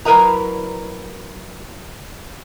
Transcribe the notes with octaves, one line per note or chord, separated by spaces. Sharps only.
F#3 E4 A#4 B4 D#5 A#5